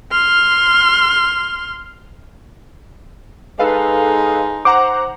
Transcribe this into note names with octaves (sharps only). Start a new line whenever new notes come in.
C6 F6
G#3 D#4 A4 B4 F5
C5 F#5 A#5 D6